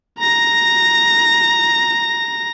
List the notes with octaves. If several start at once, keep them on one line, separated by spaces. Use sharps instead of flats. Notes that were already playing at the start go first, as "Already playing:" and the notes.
A#5 A#6